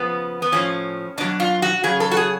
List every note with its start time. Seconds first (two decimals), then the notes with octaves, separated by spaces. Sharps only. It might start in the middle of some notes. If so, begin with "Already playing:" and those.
Already playing: C#3 F3 B3
0.42 B3
0.52 A2 F3 C#4
1.18 B2 F#3 D4
1.40 F4
1.62 F#4
1.84 C#3 F#3 G#4
2.00 A4
2.11 F#4
2.17 G#4